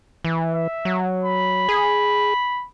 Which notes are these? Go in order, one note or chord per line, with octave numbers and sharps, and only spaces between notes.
E3
E5
F#3
B5
G#4